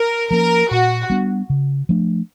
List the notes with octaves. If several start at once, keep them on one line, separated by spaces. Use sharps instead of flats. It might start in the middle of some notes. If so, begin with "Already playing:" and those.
Already playing: A#4
F3 A#3 C#4 A#4
A#2 F#4
G3 B3 D4
C#3
F3 A3 D4